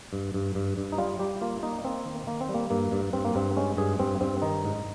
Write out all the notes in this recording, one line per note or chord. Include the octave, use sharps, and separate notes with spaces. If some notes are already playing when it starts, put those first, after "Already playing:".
G2
G2
G2
G2
D#4
G3 F4
G3 G4
A#3 F4
A#3 D#4
A#3 C4
D#3
D#3 A#3
C4
G3
A#3
G2 A#3
G2
G2 C4
A#3
G2 C4
G#3 C#4
G2 G#4
G2 C4
G2 C4
D#3 D#4
G#2